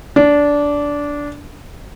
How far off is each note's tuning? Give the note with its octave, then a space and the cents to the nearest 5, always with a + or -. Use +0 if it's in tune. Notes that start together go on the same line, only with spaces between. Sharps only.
D4 -15